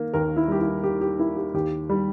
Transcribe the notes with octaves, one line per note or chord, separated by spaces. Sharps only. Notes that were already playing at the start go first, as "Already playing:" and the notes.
Already playing: D#3 A#3
D#2 A#4
E4
G3 G4
E4
D#3 G4
G4
A#3 E4
G4
D#2 G4
G3